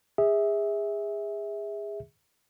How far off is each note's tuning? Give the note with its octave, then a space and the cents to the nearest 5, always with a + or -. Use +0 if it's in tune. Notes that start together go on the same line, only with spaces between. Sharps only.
G#4 -25 E5 -20